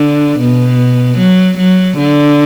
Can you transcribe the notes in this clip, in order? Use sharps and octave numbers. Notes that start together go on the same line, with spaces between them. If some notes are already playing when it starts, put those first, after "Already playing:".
Already playing: D3
B2
F#3
F#3
D3